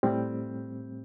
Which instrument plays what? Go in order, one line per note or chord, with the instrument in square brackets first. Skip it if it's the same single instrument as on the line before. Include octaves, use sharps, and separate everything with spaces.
[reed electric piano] A2 G3 C4